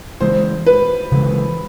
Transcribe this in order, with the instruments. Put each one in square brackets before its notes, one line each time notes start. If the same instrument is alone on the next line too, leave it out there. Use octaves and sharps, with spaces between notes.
[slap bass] C#3 E3 G#3 [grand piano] C5
[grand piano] B4
[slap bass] C#3 E3 G#3